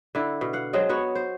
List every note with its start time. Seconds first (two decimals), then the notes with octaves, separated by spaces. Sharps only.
0.15 D3 E4
0.41 B2
0.53 F5 F#5
0.73 F#3 G#3 C4 D#5
0.89 B3 F#4 C#5
1.15 C5